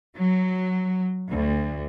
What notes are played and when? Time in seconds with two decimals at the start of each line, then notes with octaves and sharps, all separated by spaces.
0.15 F#3
1.28 D2